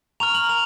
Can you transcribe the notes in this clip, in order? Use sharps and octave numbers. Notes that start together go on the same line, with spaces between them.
A#5 C#6 F6 F7
F#7
A#5 F7